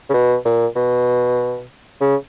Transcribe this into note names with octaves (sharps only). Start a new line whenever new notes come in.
C#3
B2
A#2
B2
C#3